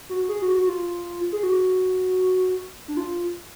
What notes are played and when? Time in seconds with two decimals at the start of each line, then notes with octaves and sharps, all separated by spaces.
0.09 F#4
0.28 G#4
0.42 F#4
0.54 F#4
0.67 F4
1.32 G#4
1.43 F#4
2.88 D4
2.97 F4